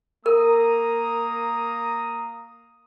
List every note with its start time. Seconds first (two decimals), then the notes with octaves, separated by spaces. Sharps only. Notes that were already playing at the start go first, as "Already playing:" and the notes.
0.26 A#3 A#4 A#5 D#6